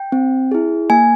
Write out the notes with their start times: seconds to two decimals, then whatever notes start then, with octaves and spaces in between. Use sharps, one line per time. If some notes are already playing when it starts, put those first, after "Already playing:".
Already playing: G5
0.12 C4
0.51 E4 G#4
0.90 A#3 G#5